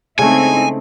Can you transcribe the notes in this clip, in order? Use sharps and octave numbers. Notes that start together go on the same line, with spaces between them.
C#3 G#3 A3 C4 D#4 E4 G#5